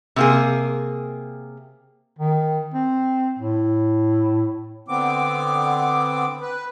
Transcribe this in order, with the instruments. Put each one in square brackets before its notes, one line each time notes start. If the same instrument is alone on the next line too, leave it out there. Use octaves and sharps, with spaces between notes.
[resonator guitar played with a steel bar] C3 A#3 G#4
[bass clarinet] D#3
C4
A2
[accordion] D3 B3 C4 D6
B4